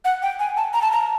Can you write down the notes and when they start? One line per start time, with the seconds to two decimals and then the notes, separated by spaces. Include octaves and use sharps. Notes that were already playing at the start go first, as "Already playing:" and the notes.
0.05 F#5
0.22 G5
0.39 G#5
0.57 A5
0.74 A#5
0.82 A5
0.92 A#5